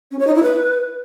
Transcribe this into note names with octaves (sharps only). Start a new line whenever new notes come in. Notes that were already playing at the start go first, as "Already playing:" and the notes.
C#4
C#5
D#4
E4
B4